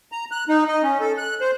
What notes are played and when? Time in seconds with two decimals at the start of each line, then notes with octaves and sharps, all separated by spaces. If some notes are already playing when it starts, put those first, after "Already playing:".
0.12 A#5
0.31 F#6
0.49 D#4
0.68 D#5
0.83 C#4
1.00 A4
1.18 F#6
1.41 C5